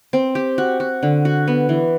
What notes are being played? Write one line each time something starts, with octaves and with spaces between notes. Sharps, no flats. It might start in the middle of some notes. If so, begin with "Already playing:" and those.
C4
G4
F#4
F#4
D3
F#4
B3
E3